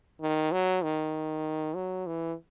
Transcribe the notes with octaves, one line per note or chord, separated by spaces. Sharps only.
D#3
F#3
D#3
F#3
E3